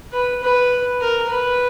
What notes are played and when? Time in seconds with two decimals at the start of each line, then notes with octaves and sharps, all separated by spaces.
0.13 B4
0.43 B4
1.00 A#4
1.29 B4